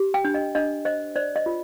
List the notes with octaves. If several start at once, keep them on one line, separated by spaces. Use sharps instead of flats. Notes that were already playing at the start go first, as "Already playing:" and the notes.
Already playing: G4
G5
D4
D#5
D4 D#5
C5 D#5
C5 D5
D#5
F4